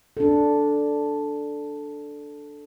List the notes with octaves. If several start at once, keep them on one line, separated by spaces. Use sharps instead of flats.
D4 A4